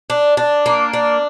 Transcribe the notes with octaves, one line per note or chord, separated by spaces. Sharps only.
D4
D4
A#3
D4